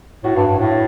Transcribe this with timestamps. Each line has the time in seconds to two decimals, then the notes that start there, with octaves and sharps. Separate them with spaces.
0.24 A2 F#4
0.36 G2
0.47 G2
0.59 A2